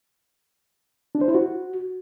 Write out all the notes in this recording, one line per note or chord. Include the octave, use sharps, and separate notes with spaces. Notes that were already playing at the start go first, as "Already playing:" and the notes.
D4
C5
E4
F#4